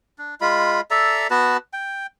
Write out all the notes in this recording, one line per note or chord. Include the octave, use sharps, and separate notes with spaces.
D4
G#3 F4 B5
A4 D5 E5 A#5
B3 F#4 B4 A5
G5